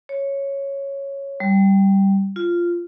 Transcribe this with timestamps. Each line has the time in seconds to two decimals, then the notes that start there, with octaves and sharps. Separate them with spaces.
0.09 C#5
1.40 G3
2.36 F4